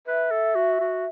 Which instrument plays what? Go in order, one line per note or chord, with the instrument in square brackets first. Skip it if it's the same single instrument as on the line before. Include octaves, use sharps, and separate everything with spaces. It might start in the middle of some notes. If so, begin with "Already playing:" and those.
[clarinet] B4 [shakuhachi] E5
[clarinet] A4
F#4
F#4